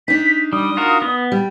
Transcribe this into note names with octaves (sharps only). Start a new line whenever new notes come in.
D4 D#4 B6
G3 D#6
F4 F#4 A#4
B3
G3